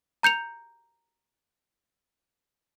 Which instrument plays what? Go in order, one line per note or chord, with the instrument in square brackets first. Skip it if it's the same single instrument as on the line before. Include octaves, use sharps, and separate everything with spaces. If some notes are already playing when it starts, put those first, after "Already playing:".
[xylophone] A#5 G6 C#7 F7